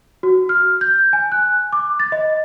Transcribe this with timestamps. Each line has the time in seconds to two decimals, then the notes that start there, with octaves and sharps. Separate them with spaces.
0.23 F#4
0.49 F6
0.81 G6
1.13 G#5
1.32 F#6
1.73 D6
2.00 A6
2.12 D#5